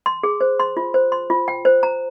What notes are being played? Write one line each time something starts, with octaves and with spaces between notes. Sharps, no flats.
C6
G#4
C5
C6
F4
C5
C6
F4
G5
C5
A#5